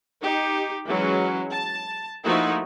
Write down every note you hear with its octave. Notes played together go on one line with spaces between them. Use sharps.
D#4 G4
E3 F#3 G#3 C#4
A5
F3 A3 A#3 D#4 E4 F#4